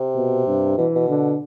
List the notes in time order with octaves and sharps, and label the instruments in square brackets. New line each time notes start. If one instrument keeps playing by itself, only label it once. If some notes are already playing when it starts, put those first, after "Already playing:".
Already playing: [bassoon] C3
[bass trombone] B2
G2
[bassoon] B2 [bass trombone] E3
[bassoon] B2
[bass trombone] D3